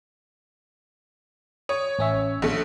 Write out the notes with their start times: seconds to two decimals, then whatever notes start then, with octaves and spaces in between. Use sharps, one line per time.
1.69 C#5 D#6
1.99 A1 C#4 E5
2.42 A#1 A3